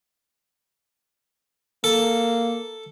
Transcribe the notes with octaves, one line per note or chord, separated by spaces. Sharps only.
A#3 A4